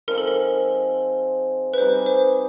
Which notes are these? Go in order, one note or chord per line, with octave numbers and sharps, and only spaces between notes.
F3 G#3 C4 D#4 A#4
A4
A#4
B4
G3 C4 D#4 G#4 C5
C5